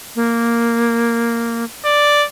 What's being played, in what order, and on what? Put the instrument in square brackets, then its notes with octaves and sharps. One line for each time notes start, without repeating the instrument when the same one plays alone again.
[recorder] A#3
[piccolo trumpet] D5